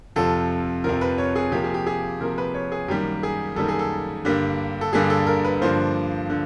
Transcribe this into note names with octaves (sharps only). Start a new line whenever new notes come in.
F2 C3 F3 A4
F2 C3 F3 A#4
B4
C#5
G#4
C3 F3 A#3 G4
G#4
G4
G#4
C3 F3 A#3 A#4
B4
C#5
G#4
F#2 D#3 G3 A#3 G4
G#4
F#2 D#3 G3 A#3 A4
G#4
A4
G2 D3 G3 A#3
A4
G2 D3 G3 A#3 G#4
A4
A#4
B4
G2 D3 F3 A#3 C5
D3